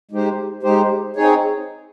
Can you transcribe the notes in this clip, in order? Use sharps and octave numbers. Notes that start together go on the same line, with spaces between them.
G#3 D#4 G4 C5
G#3 D#4 G4 C5
C4 D#4 G#4 C#5